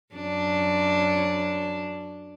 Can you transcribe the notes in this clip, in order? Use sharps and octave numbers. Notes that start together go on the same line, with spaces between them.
F#2 D4